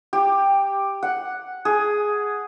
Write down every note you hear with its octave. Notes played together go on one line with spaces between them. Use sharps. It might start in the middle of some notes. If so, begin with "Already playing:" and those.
G4
F#5
G#4